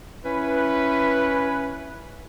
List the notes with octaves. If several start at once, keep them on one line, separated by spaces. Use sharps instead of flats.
C#4 E4 B4